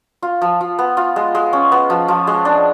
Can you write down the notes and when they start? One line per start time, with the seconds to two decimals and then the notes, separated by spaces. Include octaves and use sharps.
0.22 F4
0.42 F3
0.61 F3
0.79 B3
0.97 F4
1.16 G#3
1.35 G#3
1.53 C#4
1.72 B3
1.90 F3
2.08 F3
2.27 G#3
2.45 D4